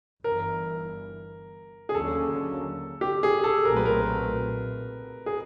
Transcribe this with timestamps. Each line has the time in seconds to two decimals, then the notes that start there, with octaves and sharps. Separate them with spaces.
0.24 G1 G2 E3 A#4
1.89 G#4
1.95 D#2 D3 F#3 A#3 C#4 A4
3.01 G4
3.23 G#4
3.44 A4
3.65 B1 A#2 F#3 A3 C4 A#4
3.76 B4
3.86 A#4
5.26 G#4